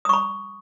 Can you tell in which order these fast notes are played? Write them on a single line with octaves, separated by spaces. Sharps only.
D#6 C#6 B5